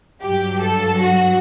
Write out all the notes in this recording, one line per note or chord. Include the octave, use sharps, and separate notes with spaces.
G2 F#3 G4
A4
F#4